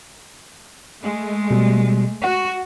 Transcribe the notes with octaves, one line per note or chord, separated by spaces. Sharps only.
G#3 A3
B2 G3
F#4 F#5